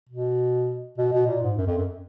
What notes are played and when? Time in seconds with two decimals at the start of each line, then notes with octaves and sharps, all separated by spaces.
0.09 B2
0.98 B2
1.13 B2
1.27 A#2
1.42 G#2
1.58 F#2
1.67 F2
1.77 F#2